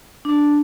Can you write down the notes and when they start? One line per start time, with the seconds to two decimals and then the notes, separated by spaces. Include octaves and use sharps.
0.25 D4